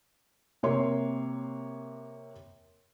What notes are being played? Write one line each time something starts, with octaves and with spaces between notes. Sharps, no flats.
C3 A#3 C#5 C6